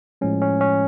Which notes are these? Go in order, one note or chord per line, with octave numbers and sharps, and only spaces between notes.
A2 F3 G#3 C#4
C#4
C#4